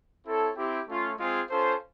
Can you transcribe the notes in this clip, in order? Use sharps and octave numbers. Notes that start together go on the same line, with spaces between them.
C4 E4 A4 C#5
C4 E4 G4
A3 C#4 F4
G#3 C4 F4 G#4
C#4 F4 A4 C5